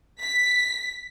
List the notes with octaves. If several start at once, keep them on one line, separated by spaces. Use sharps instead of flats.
B6